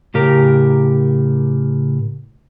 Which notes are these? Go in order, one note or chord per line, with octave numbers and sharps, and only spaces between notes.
A2 C#3 G4 A#4 A#5